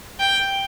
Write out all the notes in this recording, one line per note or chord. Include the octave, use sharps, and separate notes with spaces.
G5